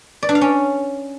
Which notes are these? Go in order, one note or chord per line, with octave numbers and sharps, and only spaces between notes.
D5
D4
F5
C#4